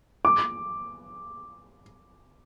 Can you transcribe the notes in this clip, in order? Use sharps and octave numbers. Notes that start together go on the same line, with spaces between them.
D6